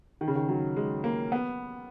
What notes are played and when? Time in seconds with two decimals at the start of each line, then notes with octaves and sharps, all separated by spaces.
0.21 D#3
0.28 C#3
0.36 D#3
0.49 F#3
0.76 G#3
1.04 A#3
1.32 B3